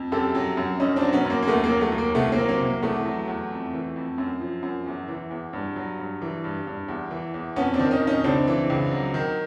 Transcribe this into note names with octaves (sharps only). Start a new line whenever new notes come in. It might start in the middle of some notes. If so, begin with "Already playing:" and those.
Already playing: F2
F#2 G4 A4
F#3
F#2
F#2 C#4 D#4
C4 D4
F#3
B3 C#4
F#2 A#3
A#3
D#2 A3 B3
A#3
F#3
A3 B3
D#2
A#3
C2 A3 B3
A#3 C4
F#3
A#3 C4
C2
A#3
E2 A3 B3
F#3
E2
F2
E3
F2
F#2
F3
F#2
E2
E3
E2
G2
F#3
G2
E3
G2
G2
E2
E3
E2
F2 B3 C#4
C4 D4
D#3
C#4 D#4
F2
C#4 D#4
C#2 C4 D4
E3
C#2
F#3
D#3